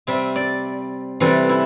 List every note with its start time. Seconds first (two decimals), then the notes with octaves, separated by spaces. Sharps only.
0.07 C3 G3 E5
0.36 D5
1.20 C3 E3 G3 A4
1.49 E4